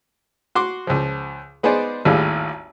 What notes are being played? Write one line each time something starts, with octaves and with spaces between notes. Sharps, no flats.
F#4 C6 D6
C#2 F3
G#3 B3 D#4 G#4 C5 D5
G#1 D#2 A2 G3 G#3 F4